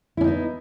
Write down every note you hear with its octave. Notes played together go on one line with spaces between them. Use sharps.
B3 C#4 D#4 E4